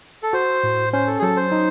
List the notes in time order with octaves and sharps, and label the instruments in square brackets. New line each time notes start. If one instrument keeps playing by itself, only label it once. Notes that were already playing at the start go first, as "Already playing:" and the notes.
[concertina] A4
[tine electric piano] F#4 [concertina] C5
[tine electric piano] A2
[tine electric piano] C#4 [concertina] C5
[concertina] A4
G#4
[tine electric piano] F#3 [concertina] A4
[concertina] C5
[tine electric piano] D#4